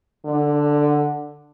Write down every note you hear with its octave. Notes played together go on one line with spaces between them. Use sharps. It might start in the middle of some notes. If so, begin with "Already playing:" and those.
D3